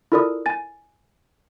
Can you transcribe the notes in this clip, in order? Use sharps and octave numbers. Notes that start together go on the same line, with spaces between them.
E4 F4 A4 A#4 D5 D#6
G#5 A6